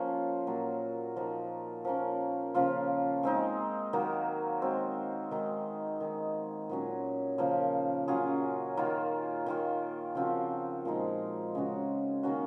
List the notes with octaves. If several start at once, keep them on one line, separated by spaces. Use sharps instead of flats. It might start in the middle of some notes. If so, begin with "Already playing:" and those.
Already playing: F3 A#3 C#4 F4
A#2 F#3 A#3 F4
F3 A#3 D#4 F#4
F3 A#3 C#4
C#3 F3 A#3 F4
G#3 C4 D#4
D#3 F#3 A#3
G#3 C4 F#4
D#3 G#3 D#4 F#4
D#3 G#3 D#4
A#2 F#3 C#4
C#3 F3 A#3
F#3 C#4 F4 G#4
D#3 A#3 F4
D#3 A#3 F4
C#3 F3 C4 F#4
A#2 F3 G#3 D#4
C#3 G#3 C#4 F#4
D#3 A#3 C#4 F#4